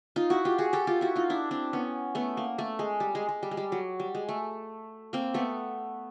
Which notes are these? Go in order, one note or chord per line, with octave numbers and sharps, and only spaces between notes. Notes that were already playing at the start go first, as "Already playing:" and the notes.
D#4 F4
E4 F#4
F4 G4
F#4 G#4
G4 A4
F4 G4
E4 F#4
D#4 F4
D4 E4
C4 D4
B3 C#4
A3 B3
A#3
A3
G#3
G3
G#3
G#3
G3
G#3
G3
F#3
G3
G#3
A3
A#3 C4
A3 B3